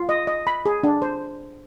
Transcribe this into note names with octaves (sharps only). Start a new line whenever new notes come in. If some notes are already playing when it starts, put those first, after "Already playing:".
Already playing: F4
D#5
D#5
B5
G#4
D4
C5